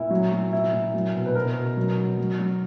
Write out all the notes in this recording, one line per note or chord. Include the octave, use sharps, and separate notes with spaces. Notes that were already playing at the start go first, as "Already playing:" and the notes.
Already playing: A#2 E4
F#3
F#3
A#2 E4
A#2
F#3
B2
B4
B2 A#4
B2
F#3
F#3
F#3
F#3